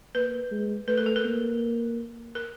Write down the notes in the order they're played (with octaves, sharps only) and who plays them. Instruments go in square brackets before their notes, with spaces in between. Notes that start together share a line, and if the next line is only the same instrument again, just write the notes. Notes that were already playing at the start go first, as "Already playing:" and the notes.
[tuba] A#3 [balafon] B4
[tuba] G#3
[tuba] A3 [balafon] B4
[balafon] A#4
A4
A#4
[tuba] A#3
[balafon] A#4